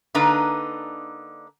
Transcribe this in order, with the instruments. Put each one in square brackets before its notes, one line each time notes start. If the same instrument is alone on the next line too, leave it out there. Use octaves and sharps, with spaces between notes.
[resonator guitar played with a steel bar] D3 A#3 D4 D#4 B4 A#5